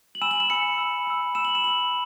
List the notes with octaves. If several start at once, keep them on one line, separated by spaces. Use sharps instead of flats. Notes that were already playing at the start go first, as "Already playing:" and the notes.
F#7
G#5 B5 E6 E7
F#7
E7
G#5 B5 E6 C#7
B5 E6
B5 E6
B5 E6 E7
F#7
E7
B5 E6 F#7